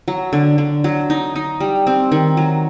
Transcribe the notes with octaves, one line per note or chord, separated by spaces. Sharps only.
F#3
D3
D3
F#3
D#4
D#4
G3
C4
D#3
F#3